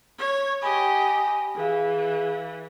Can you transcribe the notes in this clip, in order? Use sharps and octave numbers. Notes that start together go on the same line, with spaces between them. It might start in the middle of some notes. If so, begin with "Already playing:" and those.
C#5
G4 D#5 G#5 B5
E3 G#4 F5